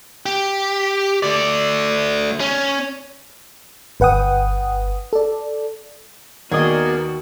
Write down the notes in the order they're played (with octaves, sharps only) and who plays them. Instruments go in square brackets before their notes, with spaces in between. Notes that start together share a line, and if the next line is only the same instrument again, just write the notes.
[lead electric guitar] G4
A3 D5
C#4
[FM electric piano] G1 B4 F#5 G5 D#6
A4 D5
[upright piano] D#2 [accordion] B3 A#4 D5 [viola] F#4 [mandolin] G#4 D#5